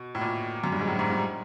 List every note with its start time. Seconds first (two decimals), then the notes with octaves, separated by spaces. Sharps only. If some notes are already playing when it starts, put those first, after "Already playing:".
Already playing: B2
0.15 A2
0.21 A#2
0.64 F#2
0.72 G2
0.79 G#2
0.87 A2
0.99 G#2
1.10 G2